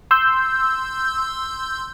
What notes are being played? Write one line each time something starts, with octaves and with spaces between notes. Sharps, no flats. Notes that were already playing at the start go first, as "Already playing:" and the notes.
C6 E6 G6